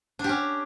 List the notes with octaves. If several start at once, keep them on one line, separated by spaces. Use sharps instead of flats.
C#4 D4 G4